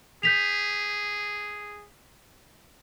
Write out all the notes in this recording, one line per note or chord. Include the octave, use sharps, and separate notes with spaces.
G#4 G6 B6 F7